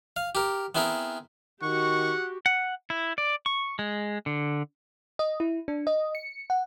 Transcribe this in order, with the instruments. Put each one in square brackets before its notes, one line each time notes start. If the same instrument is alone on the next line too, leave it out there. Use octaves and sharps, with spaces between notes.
[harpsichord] F5
G4 A#4
B3 C4 E4 G#4 A#4
[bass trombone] D#3 [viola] F#4 G4 [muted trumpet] F#5 [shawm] C#6
[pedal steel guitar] F#5
E4
D5
C#6
G#3
D3
[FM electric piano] D#5
E4
D4
D#5
C#7
F#5